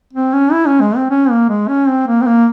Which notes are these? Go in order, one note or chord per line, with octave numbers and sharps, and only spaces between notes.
C4
C#4
E4
C#4
G#3
C4
C#4
A#3
G#3
C#4
C4
A#3
C4
A#3